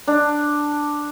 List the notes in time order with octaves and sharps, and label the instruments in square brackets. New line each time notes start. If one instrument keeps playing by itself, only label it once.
[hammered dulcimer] D4